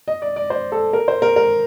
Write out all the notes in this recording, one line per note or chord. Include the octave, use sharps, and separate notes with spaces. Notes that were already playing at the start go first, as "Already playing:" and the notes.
D#5
D5
D5
C5
A4
A#4
C5
A#4
A#4